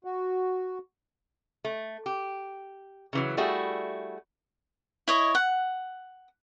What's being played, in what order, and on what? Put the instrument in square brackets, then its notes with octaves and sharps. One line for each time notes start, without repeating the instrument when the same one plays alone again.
[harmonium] F#4
[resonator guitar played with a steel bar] A3
G4
C#3 E3 F#3
G3 A3 E4 F#4 G#4
[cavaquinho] E4 C#5 D#5
F#5